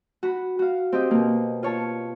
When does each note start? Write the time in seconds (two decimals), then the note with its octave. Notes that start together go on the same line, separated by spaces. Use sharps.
0.23 F#4 B5
0.59 F#4 F5
0.93 C4 G4 D#5
1.11 B2 A#3
1.63 F4 C#5 A5